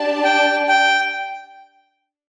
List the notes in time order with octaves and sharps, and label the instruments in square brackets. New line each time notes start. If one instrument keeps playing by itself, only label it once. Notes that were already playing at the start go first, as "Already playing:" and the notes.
Already playing: [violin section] D4 G4 D5 A5
[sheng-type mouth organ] G5
G5